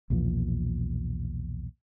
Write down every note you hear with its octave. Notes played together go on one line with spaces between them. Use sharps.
B1 E2 A#2 F3